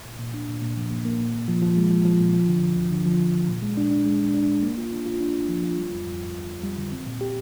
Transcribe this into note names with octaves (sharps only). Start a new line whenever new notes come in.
A#2
A#2
D4
A#2
A#2
F3
A#3
A#3
A#2
A#2
F3
F3
G#3
F3
F3
A#2
F3
D3
D2
D2
D3
F3
D2
D2
A#2
G#3
D4
D4
G#3
D4
D4
G#3
A#3
F4
D4
F4
D4
D4
F3
F4
G3
F2
F2
F2
F2
F2
G3
D3
C4
A#2
G4